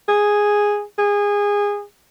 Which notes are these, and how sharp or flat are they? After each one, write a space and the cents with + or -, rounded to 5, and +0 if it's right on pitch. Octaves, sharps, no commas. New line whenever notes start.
G#4 -5
G#4 -20